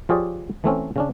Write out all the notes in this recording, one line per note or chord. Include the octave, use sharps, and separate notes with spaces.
F3 F4 G4 G#4 C#5 D5
E3 A3 C4 C#4
C#3 C#4 D4